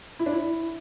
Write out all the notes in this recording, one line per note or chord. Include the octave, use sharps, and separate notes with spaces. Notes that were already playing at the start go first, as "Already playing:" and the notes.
E4
D4
E4